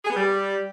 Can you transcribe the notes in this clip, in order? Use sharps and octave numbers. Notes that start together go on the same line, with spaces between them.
G#4
B3
G3